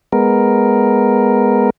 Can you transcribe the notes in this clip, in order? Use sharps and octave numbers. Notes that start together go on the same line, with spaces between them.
G#3 B3 A#4